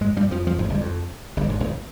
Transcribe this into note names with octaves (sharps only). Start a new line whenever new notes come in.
G#2 G#3
G2 G3
F2 F3
F2 F3
G#1 G#2
G1 G2
F2
G1 G2
G#1 G#2
G#1 G#2